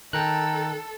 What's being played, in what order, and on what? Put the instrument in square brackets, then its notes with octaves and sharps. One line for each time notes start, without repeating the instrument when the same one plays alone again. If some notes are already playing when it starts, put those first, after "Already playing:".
[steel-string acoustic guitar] D#3 [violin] A4 [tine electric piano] G5 A#5 F#6